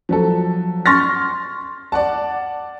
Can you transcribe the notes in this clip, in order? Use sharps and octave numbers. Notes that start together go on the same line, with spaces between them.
F3 F#3 A4
C6 C#6 F6 A6 A#6
D5 F#5 A5